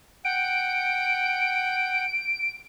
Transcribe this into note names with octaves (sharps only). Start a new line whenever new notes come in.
F#5 G5 D7